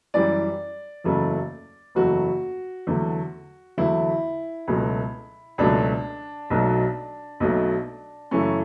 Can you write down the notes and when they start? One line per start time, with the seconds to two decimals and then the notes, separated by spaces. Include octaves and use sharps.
0.14 F#2 E3 G3 D5
1.04 F#1 E2 C#3 F#3 A3
1.95 F#1 E2 C#3 F#3 A3 F#4
2.87 E2 D3 F#3 A3
3.77 E2 D3 F#3 A3 E4
4.68 C#2 B2 F#3 A3
5.58 C#2 B2 F#3 A3 D4
6.50 B1 B2 F#3 A3
7.40 B1 B2 F#3 A3
8.31 F#2 C#3 E3 A3 C#4